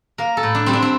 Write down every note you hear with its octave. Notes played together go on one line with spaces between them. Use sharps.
A#3 A#4
A4
A2
D4
G3 C4
D4
C4